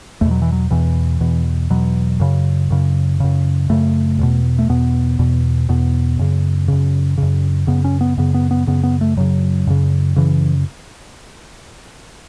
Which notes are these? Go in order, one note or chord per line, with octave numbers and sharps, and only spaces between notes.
E2 B2 A3
F#3
E3
F#3
E2 B2 E3
E2 B2
E2 B2 F#3
F#2 C#3
F#2 C#3
F#2 C#3
F#2 C#3 A3
E2 B2
A3
E2 B2 B3
E2 B2
E2 B2 B3
F#2 C#3
F#2 C#3
C#3
F#2
F#2 C#3 B3
C#4
B3
F#2 C#3 B3
B3
B3
F#2 C#3 B3
B3
A3
F#2 C#3 F#3
F#2 C#3
F#2 C#3 E3